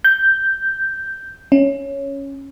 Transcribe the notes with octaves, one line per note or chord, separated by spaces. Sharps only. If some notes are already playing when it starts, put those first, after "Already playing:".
G6
C#4